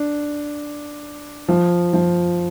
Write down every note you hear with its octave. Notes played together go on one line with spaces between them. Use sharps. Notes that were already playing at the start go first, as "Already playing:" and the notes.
Already playing: D4
F3
F3